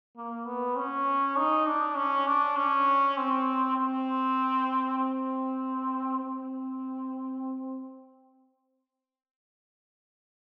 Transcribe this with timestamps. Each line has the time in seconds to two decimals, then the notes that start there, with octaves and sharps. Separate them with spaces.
0.17 A#3
0.46 B3
0.77 C#4
1.37 D#4
1.67 D4
1.96 C#4
2.27 D4
2.57 C#4
3.17 C4
3.77 C4
4.98 C4
6.18 C4